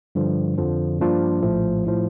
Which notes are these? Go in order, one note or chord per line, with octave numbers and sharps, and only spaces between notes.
G2 D3 F3
F2 D3 F3
G2 F3 A#3 D4 F4
A#1 A2 F3 A3
A2 F3